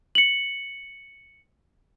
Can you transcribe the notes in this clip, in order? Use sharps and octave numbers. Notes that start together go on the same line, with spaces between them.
C#7 F#7